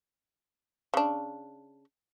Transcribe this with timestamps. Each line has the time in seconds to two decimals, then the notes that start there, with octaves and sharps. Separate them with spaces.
0.94 C#3 D4